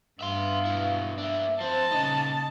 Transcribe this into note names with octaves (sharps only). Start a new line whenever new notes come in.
G2 B3 E5 F5 C6
B2 E4
A#3 D4 E5
F3 C4 C5 A5
A#2 C#3 D#4 D#5